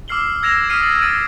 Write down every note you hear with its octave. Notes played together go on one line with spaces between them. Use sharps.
D6 E6 F6 C7 F#7 G7
E6 G#6 A#6 D7 E7 F7
D#6 F6 B6 C7 D7 D#7
A6 F#7
E6 A6 D7 D#7